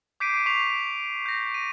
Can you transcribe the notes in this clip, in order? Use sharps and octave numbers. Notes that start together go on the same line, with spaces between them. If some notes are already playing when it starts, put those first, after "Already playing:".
D6 G6 B6 C7 D7 D#7
C#6 B6 C7 F7
G6 A#6
D#7